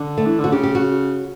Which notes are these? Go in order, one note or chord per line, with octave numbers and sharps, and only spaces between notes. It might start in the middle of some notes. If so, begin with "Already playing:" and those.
Already playing: D3
A3
E3
D3
F#4
C#3 G4
G4
F#4